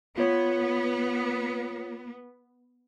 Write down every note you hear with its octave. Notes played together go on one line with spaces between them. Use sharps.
B3 F4 C#5